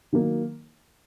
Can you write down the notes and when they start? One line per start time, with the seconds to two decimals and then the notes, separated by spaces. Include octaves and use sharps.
0.12 D#3 F#3 A#3 D#4